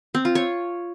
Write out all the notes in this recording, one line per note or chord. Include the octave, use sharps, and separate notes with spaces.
C4
F4
C#5